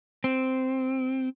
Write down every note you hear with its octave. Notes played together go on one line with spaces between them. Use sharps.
C4